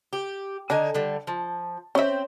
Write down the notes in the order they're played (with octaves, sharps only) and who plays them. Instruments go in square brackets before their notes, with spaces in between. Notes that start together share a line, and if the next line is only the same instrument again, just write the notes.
[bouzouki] G4
[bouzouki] D3 D#4 G#5 [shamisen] D4
[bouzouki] D3 G3
F3
[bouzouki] C4 C5 [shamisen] C#4 E5